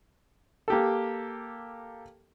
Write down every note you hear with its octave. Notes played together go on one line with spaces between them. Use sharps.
A#3 G4 A4